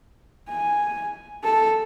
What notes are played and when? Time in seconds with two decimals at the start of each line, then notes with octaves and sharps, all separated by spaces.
0.49 G#5
1.44 A4